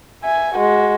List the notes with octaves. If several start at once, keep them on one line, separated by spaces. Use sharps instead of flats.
E5 G#5
G#3 F#4